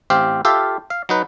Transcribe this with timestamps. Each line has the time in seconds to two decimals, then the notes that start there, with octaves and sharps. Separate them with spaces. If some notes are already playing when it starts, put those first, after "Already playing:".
0.10 A1 C4 G4 F5
0.45 F4 G4 A4 E5 F5
0.90 F5
1.09 F#3 D#4 B4